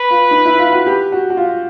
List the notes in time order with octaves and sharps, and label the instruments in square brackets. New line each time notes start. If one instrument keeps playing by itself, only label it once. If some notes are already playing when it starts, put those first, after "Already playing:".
Already playing: [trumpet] B4
[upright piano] F4
D#4
E4
F4
F#4
G4
F#4
F#4
F4